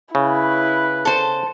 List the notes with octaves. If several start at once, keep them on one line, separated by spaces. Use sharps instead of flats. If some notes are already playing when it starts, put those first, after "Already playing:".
C#3 E4 B4
A4 C5